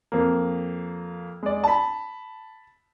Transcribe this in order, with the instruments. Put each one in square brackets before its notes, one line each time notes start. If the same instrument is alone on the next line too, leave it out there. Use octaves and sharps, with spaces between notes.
[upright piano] F2 A#3
G#3 D5
A5 B5